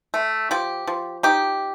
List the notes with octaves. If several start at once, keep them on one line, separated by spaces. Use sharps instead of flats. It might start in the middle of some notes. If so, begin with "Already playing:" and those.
A3
F3 G4
F3
D#4 G4